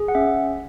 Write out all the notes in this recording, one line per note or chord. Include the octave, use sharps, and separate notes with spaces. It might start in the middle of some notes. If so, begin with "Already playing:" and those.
Already playing: G#4
F#5
C#4 E5